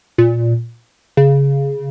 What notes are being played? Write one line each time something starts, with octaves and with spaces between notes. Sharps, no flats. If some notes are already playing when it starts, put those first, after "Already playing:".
A#2
C#3